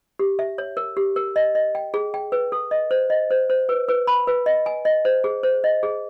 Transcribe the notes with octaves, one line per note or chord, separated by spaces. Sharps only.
G4
E5
C#5
A#4
G4
A#4
D#5
D#5
G5
G#4
G5
B4
A4
D#5
C5
D#5
C5
C5
B4
B4
B5
B4
D#5
G#5
D#5
C5
G#4
C5
D#5
G#4